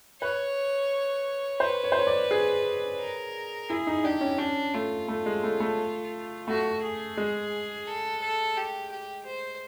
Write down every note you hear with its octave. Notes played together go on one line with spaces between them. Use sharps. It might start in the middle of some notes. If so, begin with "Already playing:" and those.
B4 C#5
B4 C5
C#5
C5
C#5
D5
G#4
A#4
E4 G#4
D#4
D4 G4
C#4
C#4 D4
A3 F4
A3
G#3
A3
A3
A3 F#4
G#4
G#3
A4
A4
G4
G4
C5